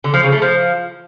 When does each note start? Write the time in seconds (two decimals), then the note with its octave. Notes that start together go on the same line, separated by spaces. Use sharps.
0.04 D3
0.14 F3
0.23 C#3
0.32 A3
0.42 F3